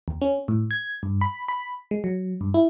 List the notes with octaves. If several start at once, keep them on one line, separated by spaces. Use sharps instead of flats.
D#2
C#4
A2
G#6
G2
B5
B5
G#3
F#3
G2
E4